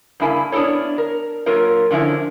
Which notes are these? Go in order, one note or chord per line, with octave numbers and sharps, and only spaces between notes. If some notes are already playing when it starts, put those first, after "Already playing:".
G2 C#3 A#3 E4 G#5
B3 C#4 D4 E4 A4 C#5
A#4
F#3 A#3 F4 A#4 C#5
D3 F3 C#4 E4